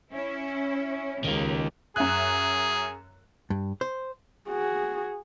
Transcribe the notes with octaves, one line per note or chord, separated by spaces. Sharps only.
C#4 E4
C#2 D#3 A#3
F#2 G#4 E5 F#6
G2
C5
F#4 G#4